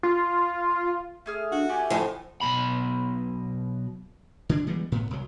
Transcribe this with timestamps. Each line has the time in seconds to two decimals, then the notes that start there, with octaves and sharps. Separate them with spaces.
0.03 F4
1.26 A3 G#4 F6
1.52 D4 F#4
1.69 A3 G4 D5 G#5
1.90 D2 A2 F3
2.41 B1 G2 B2 B5
4.49 D3 D4
4.67 E3 G3 G#3 B3
4.92 A2 B3
5.11 C2 F#3